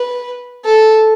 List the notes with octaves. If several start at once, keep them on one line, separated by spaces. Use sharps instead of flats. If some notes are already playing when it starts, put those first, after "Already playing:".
Already playing: B4
A4